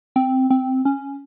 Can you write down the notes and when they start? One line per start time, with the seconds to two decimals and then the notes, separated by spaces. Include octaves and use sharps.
0.16 C4
0.50 C4
0.85 C#4